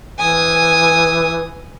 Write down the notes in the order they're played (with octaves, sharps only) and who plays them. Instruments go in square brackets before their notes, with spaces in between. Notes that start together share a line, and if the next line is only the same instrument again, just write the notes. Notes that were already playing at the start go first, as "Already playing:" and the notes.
[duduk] E3 [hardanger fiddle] G#5 D#6